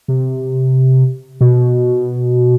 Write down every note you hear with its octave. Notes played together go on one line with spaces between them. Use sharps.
C3
B2